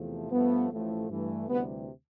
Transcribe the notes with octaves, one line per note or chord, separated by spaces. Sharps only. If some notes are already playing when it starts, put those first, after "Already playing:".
Already playing: E2 C3 F3 A3
G2 F3 A3 B3
A1 A2 F3 A3
G2 E3 A3
D2 C3 E3 G3 B3